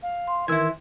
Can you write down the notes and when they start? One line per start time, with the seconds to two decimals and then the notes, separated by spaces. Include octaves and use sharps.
0.03 F5
0.28 C6
0.48 D#3 E3 E4 A#4 E6 G#6